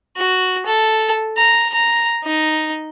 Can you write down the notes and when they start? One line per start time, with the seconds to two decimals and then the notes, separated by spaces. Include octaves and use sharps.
0.17 F#4
0.66 A4
1.37 A#5
1.74 A#5
2.25 D#4